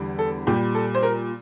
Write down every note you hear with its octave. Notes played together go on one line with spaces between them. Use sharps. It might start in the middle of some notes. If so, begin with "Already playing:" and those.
Already playing: E2 D3 G3
A4
A#2 G3 G4
A4
C5
A#4